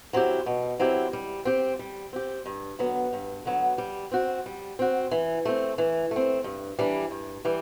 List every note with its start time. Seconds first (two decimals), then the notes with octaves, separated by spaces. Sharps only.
0.13 F#3 C4 E4 G4
0.46 B2
0.79 F#3 C4 E4 G4
1.13 G3
1.45 C4 G4
1.79 G3
2.13 C4 G4
2.46 G2
2.79 D3 F#3 B3
3.13 G2
3.45 D3 F#3 B3
3.78 G3
4.12 C4 F#4
4.46 G3
4.79 C4 F#4
5.11 E3
5.45 A3 C4
5.78 E3
6.11 A3 C4
6.44 G2
6.79 E3 G3 D4
7.11 G2
7.45 E3 G3